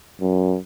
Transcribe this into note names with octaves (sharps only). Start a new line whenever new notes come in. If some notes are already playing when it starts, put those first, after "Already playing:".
F#2